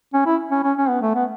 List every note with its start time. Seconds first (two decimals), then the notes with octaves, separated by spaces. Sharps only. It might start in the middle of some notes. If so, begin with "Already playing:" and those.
0.14 C#4
0.27 E4
0.51 C#4
0.64 C#4
0.77 C#4
0.89 B3
1.02 A3
1.15 B3